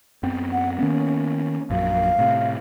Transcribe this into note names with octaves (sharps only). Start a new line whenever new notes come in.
F#2 B3 C4
F#5
D#3 A#3 B3 C#4
A#1 F#2 F5
A2 C3